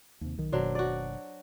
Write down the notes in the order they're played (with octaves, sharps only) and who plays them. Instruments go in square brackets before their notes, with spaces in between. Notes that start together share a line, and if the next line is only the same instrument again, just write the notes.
[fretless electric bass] D#2 C3
B1 D#3
[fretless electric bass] F#1 B2 D#3 [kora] F#3 D4 C5
[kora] F#4 D5